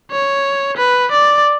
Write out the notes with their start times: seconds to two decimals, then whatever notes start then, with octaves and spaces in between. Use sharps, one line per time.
0.11 C#5
0.77 B4
1.11 D5